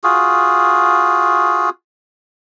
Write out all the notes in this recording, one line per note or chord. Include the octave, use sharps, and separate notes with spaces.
F4 F#4 G#4